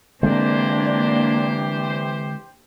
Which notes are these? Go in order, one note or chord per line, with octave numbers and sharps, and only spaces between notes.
D3 E3 G#3 A#3 C4 D4 G4 C5